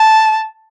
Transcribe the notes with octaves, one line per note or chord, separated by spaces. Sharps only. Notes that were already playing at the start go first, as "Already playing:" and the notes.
Already playing: A5